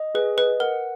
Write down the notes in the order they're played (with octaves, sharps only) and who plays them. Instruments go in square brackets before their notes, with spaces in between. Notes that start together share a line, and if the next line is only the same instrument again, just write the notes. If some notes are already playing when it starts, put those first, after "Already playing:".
Already playing: [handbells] D#5
[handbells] G#4 [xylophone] B4
[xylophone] B4 [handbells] D#5
[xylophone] A#4 [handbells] F#5